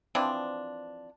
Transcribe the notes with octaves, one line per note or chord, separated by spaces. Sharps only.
E3 F3 C4 D4